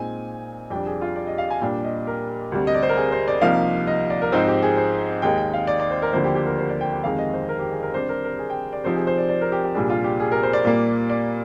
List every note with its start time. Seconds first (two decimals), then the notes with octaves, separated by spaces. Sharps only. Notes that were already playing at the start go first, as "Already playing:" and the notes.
Already playing: A#2 G#3 C4 D#4 G#5
0.70 F2 C3 G3 D4 G5
0.86 G#4
1.01 F4
1.16 D5
1.27 D#5
1.38 F5
1.50 G#5
1.61 A#2 G3 D4 G5
1.84 D#5
2.07 A#4
2.52 D2 C3 G3
2.67 D#5
2.74 D5
2.83 C5
2.89 A#4
2.97 G#4
3.12 C5
3.28 D5
3.41 C2 C3 F3 A#3 D#4 F5
3.87 D#5
4.10 D5
4.22 A#4
4.32 G#2 F3 C4 D#4 C5
4.48 G4
4.62 G#4
4.77 C5
5.22 D#2 D#3 G#3 D#4 G5
5.38 G5
5.54 F5
5.67 D5
5.80 D5
5.91 C5
6.02 A#4
6.13 D2 D3 F3 A#3 C5
6.24 G4
6.35 G4
6.47 A#4
6.59 C5
6.69 D5
6.81 G5
6.92 G5
7.03 F2 C3 D#3 G#3 F5
7.18 D#5
7.33 C5
7.49 A#4
7.59 G4
7.72 G#4
7.83 A#4
7.93 C3 G3 D4 C5
8.09 A#4
8.25 A#4
8.39 G#4
8.50 G5
8.73 D5
8.84 C3 F3 C4 D#4 C5
8.96 G#4
9.07 C5
9.18 D5
9.29 D5
9.41 A#4
9.52 G4
9.64 G4
9.74 C2 A#2 G3 D4 G#4
9.90 F4
10.04 G4
10.20 G#4
10.32 A#4
10.43 C5
10.53 D5
10.65 A#2 G3 A#3
11.10 D5